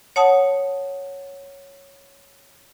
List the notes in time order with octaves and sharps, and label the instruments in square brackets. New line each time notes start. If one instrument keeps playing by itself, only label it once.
[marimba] C#5 F#5 A5 D#6